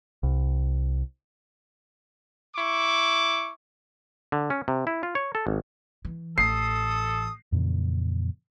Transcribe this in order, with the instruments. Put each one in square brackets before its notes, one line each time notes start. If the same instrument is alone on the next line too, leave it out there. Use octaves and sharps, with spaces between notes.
[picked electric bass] C2
[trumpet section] E4 C#6 D6
[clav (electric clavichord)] D3
C#4
C3
E4
F4
C#5
A4
G#1
[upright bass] E3
[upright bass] A1 [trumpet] A4 [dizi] D#6 [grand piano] C7
[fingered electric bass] F2 A#2 C#3 E3